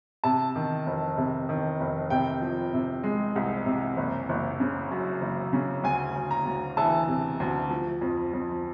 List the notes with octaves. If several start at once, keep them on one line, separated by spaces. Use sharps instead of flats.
C3 A5
D#3
F1
C3
D#3
F1
C3 G5
F3
C3
G#3
C2
C3
F#1
F#1
C#3
F#2
F#1
C#3
D2 G#5
D2
A#5
D2
E3 A5
C3
D2
F3
F2
F2